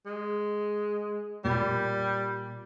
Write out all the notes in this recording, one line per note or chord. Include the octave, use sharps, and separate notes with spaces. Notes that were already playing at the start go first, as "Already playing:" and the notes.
G#3
A#2 G3 B5